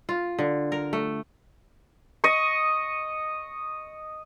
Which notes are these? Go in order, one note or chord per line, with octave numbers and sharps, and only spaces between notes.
F4
D3
A#4
A3
D#5 C#6